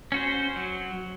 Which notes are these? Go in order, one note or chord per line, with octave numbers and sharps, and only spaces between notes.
C#4 F#4 C5
F#3